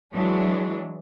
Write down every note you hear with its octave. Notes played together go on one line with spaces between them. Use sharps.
E3 F#3 G#3 D4